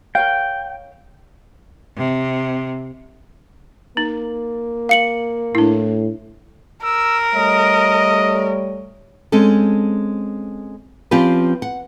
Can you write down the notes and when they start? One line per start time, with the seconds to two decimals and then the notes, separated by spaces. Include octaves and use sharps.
0.15 A#4 C#5 F5 G5
1.96 C3
3.97 A#3 D#4
4.89 F5 C#7 F#7
5.55 A2 D4 E4
6.84 A#4 E6
7.35 G3 A3 C#5 D#5
9.32 G#3 C4 C#4 A4
11.11 F3 C4 C#4 F4 G4 B4
11.62 F#5